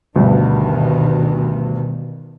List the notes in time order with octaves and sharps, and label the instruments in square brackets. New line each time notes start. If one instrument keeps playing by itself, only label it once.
[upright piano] D2 G2 [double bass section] B2 D#3